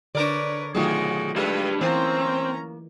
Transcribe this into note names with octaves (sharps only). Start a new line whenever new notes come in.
D3 D4 A#4 B4 C#5 D5
B2 D#3 F#3 A3 F4 F#4 G#4
G3 G#3 D4 B4
E3 A#3 C4 C#4 A#5